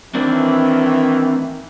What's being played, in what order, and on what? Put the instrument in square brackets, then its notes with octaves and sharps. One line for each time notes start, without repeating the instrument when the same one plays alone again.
[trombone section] D#3 E3 [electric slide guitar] A#3 C4 D4